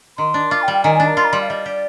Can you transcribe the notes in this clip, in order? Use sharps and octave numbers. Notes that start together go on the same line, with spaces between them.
D#3 C6
D4
F4 D6
G5
G3
G5
D#3 G#5
D4 G#5
A#5
F4 C6
A#5
G3 C6
F5
G3 D#5
G4 D5